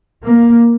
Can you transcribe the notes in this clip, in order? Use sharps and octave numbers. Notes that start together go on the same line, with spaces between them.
A#3